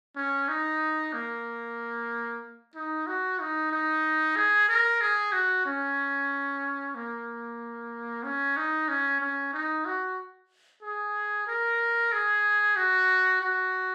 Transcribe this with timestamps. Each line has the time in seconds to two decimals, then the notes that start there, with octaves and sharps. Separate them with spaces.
0.16 C#4
0.49 D#4
1.13 A#3
2.75 D#4
3.07 F#4
3.40 D#4
3.72 D#4
4.36 G#4
4.69 A#4
5.01 G#4
5.33 F#4
5.66 C#4
6.95 A#3
8.24 C#4
8.57 D#4
8.89 C#4
9.21 C#4
9.53 D#4
9.85 F#4
10.83 G#4
11.48 A#4
12.13 G#4
12.76 F#4
13.41 F#4